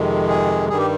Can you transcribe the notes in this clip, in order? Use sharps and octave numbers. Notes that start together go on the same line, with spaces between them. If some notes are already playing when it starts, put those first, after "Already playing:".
Already playing: F2 C3 D#3 G#3
G#4
G2 D#3 G3 G#4
G4